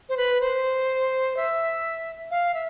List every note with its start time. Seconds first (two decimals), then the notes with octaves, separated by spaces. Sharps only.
0.09 C5
0.17 B4
0.41 C5
1.37 E5
2.31 F5
2.54 E5